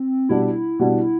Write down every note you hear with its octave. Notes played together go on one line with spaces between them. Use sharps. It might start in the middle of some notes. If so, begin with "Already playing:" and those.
Already playing: C4
B2 G3 D4 E4
B2 G3 D4